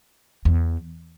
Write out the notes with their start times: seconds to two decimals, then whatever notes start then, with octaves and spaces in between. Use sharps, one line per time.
0.45 E2